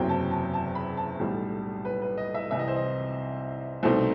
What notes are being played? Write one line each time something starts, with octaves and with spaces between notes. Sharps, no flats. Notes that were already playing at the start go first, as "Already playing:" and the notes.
Already playing: F#1 E2 C3 F#3 C4 G5
A5
A5
A5
B5
A5
B1 A2 G3
B4
B4
D#5
E5
C2 C3 E3 E5
D#5
C5
D#5
C2 B2 A3 D#4 C5